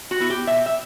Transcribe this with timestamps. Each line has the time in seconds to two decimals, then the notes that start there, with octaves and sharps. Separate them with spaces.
0.11 F#4
0.20 B3 E4
0.30 G4
0.47 B2 E5
0.66 E5